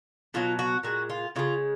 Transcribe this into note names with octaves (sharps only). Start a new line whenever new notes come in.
B2 F#3 F4
F#4
A#2 G#3 F#4
F4
C#3 G#3 F4